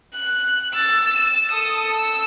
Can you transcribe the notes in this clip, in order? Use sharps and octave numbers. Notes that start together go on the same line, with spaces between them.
F#6
E6 A6
E7
A4 D#6
E6